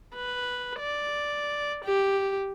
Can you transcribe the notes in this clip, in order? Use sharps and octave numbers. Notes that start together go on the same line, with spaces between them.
B4
D5
G4